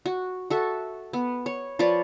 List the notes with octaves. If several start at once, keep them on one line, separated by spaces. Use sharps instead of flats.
F#4
F#4 A4 E5
B3
C#5
F3 B4 C#5 D5